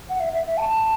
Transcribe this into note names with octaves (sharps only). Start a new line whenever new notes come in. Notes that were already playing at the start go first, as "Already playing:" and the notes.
F#5
E5
E5
E5
A5